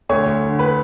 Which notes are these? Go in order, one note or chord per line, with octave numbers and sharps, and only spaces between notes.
D2 C#5 C#6
D2
D3
B4 B5